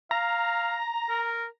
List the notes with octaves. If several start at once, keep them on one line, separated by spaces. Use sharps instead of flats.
F5 A#5
A#4